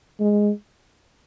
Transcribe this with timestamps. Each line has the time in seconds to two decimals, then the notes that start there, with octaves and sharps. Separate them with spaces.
0.20 G#3